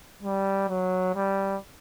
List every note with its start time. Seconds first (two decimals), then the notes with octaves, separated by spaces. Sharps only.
0.23 G3
0.69 F#3
1.15 G3